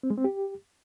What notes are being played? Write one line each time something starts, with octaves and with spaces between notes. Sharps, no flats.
C4
G#3
C4
G4